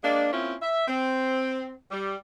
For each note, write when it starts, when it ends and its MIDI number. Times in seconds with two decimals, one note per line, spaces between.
0.04 0.31 56
0.04 0.31 58
0.04 0.31 62
0.33 0.54 58
0.33 0.54 60
0.33 0.54 61
0.33 0.54 64
0.33 0.54 65
0.62 0.87 76
0.88 1.77 60
1.91 2.14 55